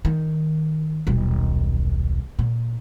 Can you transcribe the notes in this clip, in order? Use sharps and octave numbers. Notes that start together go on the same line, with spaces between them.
D#3
D#1 B1
A#2